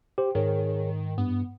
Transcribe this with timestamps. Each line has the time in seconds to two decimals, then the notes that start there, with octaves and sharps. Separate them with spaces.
0.18 G4 C5 G5
0.35 G#2 D#3 G#4 A#4 C#5
1.18 G2 B3